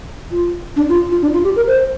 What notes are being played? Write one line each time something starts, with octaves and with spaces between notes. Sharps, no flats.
F4
D4
F4
F4
D4
F4
G4
A#4
C5